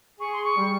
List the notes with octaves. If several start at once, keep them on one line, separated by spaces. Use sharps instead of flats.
G#4 C#6
C6
C#6
G3